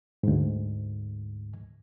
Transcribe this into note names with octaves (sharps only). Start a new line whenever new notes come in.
D2 G#2